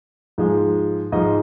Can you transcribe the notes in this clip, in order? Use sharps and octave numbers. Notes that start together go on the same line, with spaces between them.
G#2 F3 G#3
G#2 F3 G#3 D#5